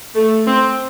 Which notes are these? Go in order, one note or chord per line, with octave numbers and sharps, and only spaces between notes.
A3
C4